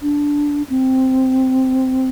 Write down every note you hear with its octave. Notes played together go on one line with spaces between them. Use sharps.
D4
C4